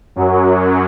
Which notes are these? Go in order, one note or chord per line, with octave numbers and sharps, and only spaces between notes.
F#2 F#3